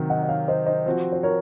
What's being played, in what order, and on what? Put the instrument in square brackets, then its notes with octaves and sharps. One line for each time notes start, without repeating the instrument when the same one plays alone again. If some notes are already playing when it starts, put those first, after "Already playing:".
Already playing: [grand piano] C3 D#3 F#3
[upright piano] D#5 F#5
D#5
C#5 F5
C5 D#5
C5 D#5
[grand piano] F3 C4 F#4
[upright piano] C5
A#4 C#5